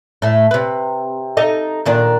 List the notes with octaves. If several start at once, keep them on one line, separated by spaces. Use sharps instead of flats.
A2 A3
C3 B4
D#4 A4 D#5
A#2 D#3 D4